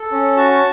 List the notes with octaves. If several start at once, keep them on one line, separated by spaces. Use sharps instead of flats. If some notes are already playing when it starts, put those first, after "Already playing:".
Already playing: A4
C#4
F#4 A5